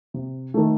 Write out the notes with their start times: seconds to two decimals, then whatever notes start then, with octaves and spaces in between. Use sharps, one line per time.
0.14 C3
0.54 D#3 A3